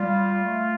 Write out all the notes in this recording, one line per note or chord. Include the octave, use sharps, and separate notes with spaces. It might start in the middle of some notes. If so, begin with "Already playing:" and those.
Already playing: G3 F4
A3